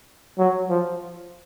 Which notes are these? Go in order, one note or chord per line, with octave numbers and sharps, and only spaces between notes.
F#3
F3